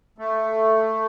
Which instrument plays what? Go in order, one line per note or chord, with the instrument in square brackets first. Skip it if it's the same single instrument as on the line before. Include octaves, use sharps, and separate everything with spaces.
[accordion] A3